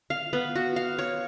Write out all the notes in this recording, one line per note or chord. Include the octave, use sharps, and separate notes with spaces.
F5
B3
F#4
F5
C#5